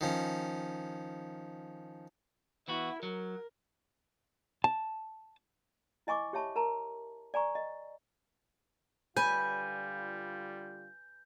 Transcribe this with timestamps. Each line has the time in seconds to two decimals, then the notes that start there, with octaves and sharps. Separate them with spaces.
0.01 D#3 F3 C#4
2.68 E3 B3 E4 F#4
3.03 F#3 A#4
4.64 A5
6.07 E4 D#5 G#5 C#6 D6
6.33 G4 C#5 E5 A5 B5 C#6
6.56 A#4 A5 A#5
7.34 D5 G#5 A#5 C#6
7.55 D#5
9.17 D3 G3 F4 B4 G#5 G6